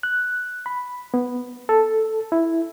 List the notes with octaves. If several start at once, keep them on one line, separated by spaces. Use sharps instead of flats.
F#6
B5
B3
A4
E4